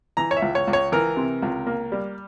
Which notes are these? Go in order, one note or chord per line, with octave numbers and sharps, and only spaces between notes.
E3 A#5
C#5
E5
C#2
C#5
C#2
C#5
E3 A#4
C3
C#2
A#3
G3